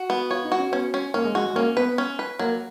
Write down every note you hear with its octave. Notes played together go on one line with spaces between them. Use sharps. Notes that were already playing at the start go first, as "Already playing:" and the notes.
Already playing: F#4
B3
F4 C#5
D#4
F#4
C#4
B3 C#4
C#4
A#3 C#4
G#3
G#3 F#4
G#3
A#3 C#4
B3 B4
C#4
B4
F#3 A#3